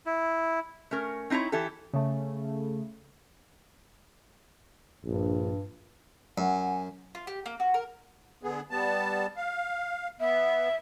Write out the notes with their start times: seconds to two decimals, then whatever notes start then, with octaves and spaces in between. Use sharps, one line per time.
0.06 E4
0.91 A3 C#4 A#4
1.30 C4 D#4 E4 C#5 A#5
1.52 E3 E4 G4 A4
1.94 C#3 A3
5.05 A#1 G2
6.38 F#2 F#5 G#5
7.15 F4
7.27 G4
7.46 A#3
7.60 F#4
7.74 A#4
8.43 D3 B3 G#4
8.71 G3 B3 A5
9.36 F5
10.20 B3 E5